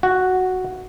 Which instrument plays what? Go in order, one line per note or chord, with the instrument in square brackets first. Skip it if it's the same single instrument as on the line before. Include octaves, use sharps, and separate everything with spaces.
[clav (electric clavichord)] F#4